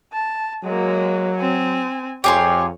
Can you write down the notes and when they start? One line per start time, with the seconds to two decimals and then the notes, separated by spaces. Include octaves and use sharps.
0.13 A5
0.64 F#3 G#3 A#3
1.39 C4 G#5
2.24 F2 G4 G#4 C#5 C6